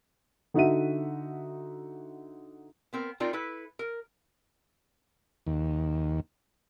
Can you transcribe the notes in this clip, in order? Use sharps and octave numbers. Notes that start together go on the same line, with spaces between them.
D3 D#4 F#4 E5 D#7
B3 C4 A#4
C4 D4 D#4 F4 A#4 D5
E4 A4 B4
A#4
D#2